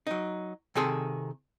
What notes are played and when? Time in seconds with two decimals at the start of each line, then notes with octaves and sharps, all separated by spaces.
0.07 F#3 D#4
0.75 C3 D#3 G#4 A4 C6